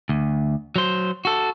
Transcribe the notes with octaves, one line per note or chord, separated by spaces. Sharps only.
D2
F#3 C5
F#4 A4